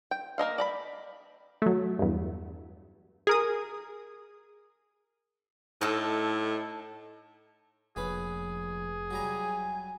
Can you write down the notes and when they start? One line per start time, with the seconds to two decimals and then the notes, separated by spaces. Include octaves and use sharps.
0.11 G5
0.38 A#3 A#4 D#5 F5
0.58 D5 A#5 B5
1.62 F#3 A3
1.99 E2 G2
3.27 G#4 A#4 D#6
5.81 A2 D#4 A4
7.96 F1 A#1 C#4 G#4 B4
9.11 F#3 G3 G#5 A#5